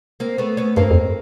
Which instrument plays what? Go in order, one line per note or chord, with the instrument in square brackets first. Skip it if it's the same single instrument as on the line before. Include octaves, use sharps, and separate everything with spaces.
[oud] A#3 C4
A3 B3
B3 C#4
[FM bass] G2 [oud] A#3 C4
[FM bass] F2